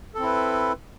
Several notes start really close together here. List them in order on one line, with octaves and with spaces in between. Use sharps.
A4 C4 E4 B4